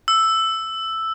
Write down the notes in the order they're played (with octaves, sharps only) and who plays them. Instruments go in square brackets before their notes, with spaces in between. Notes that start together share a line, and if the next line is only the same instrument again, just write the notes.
[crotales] E6